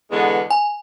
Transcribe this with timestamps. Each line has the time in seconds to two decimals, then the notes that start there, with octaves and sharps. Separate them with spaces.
0.11 E2 D3 G#3 B3
0.50 G#5